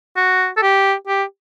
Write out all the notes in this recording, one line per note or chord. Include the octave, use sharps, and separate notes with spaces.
F#4
A4
G4
G4